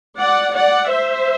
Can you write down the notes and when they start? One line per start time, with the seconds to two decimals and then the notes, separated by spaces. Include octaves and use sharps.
0.18 D5 F#5
0.54 D5 F#5
0.91 C5 E5